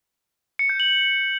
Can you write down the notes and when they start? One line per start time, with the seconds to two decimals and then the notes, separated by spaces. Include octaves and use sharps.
0.59 C#7
0.69 G6
0.80 F#7